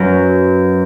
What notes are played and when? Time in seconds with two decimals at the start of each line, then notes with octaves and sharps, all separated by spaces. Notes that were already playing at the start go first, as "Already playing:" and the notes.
Already playing: F#2 F#3 B4